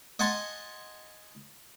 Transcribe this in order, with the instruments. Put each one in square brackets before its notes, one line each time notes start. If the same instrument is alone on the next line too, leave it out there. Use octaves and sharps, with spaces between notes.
[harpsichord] D#5 F#5 G#5 A5 C6